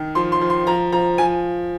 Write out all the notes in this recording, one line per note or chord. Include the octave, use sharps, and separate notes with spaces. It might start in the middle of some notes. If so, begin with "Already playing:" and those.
Already playing: D#3
F3 C6
C6
F3
C6
F3 A#5
F3 A#5
F3 G#5